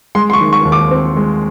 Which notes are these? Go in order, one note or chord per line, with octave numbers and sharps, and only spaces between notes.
G#3 C6
C6
C#6
D#3
C#6
D#2
D6
C4
G#3